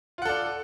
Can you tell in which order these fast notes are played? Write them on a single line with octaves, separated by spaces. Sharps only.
F4 F#5 A4 D5